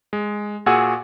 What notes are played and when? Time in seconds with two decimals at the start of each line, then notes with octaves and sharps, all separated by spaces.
0.13 G#3
0.66 A#2 F#4 G#4 F#5 G#5 E6